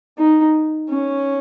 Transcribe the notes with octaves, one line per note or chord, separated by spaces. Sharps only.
D#4
C#4